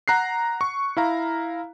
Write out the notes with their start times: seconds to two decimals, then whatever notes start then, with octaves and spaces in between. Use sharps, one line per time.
0.08 F#5 A#5 F#6 C7
0.61 C#6
0.97 E4 F5 A#5